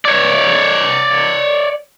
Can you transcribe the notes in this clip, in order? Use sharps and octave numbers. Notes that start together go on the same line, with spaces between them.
C#5 D5